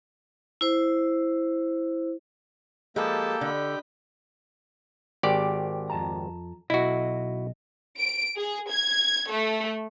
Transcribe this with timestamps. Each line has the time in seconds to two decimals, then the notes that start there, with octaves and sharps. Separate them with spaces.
0.61 E4 C5
2.96 F3 G#3 A#3 G4 A4 A5 B5
3.41 D3 D#5 B5
5.23 G#1 G4 D5
5.90 F2 A5 A#5
6.70 B1 E4 F#4 D#5
7.98 D7
8.36 G#4
8.70 G#6
9.29 A3